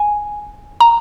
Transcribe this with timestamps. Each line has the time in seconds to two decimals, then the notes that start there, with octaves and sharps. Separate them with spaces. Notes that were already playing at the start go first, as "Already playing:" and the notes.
Already playing: G#5
0.81 A#5